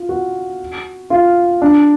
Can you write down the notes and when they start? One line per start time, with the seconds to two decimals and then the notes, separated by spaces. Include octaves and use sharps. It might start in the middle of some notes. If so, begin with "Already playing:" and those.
Already playing: F4
0.09 F#4
1.10 F4
1.62 D4